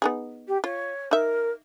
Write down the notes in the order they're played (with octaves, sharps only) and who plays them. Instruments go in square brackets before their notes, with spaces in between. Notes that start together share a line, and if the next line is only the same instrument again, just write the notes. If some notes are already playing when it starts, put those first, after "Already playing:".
[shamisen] B3 D#4 G#4
[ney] G4
[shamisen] F4 [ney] C#5
[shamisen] D#4 E5 [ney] A#4